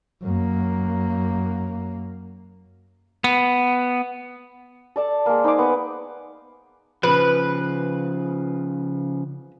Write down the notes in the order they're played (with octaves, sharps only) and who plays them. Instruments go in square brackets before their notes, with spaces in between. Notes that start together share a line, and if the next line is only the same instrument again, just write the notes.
[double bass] F#2 A#3
[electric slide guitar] B3
[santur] A4 D5 A5
G#3 A#3
D#4 C5 G#5 D6
B3
[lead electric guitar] C#3 F3 [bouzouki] B4